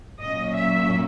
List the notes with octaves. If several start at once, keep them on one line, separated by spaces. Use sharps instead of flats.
A#2 F#3 A#3 C#4 D#5
E5